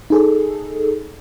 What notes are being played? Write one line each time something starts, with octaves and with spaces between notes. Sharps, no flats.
D#4 G#4 A4